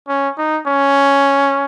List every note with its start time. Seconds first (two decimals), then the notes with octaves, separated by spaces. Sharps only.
0.08 C#4
0.38 D#4
0.67 C#4